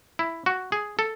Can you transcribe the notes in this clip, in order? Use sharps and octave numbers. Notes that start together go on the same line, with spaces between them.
E4
F#4
G#4
A4